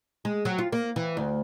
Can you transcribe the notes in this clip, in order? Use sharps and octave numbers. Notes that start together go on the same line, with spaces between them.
G#3
F#3
F4
A#3
E3
D2